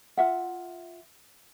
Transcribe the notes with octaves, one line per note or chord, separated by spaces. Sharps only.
F4 E5 F#5